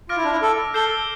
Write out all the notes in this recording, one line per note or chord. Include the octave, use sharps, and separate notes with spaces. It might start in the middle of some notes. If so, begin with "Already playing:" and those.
F4 D6 F6 A#6 D7
E4
D4
E4
A4
A4 G6 C7 E7 G7